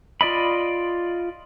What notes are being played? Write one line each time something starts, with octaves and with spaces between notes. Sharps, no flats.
F4 D5 D#5 B5